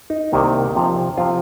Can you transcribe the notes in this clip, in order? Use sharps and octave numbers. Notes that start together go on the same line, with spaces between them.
D#4
C2 C3 D#3 A#3
C3 F3 C4
C3 F3 C4 F4